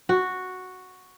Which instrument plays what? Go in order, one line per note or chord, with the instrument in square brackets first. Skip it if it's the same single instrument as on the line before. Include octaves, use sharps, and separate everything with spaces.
[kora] F#4